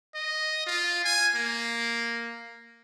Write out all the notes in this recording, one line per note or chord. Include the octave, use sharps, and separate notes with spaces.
D#5
F4
G#5
A#3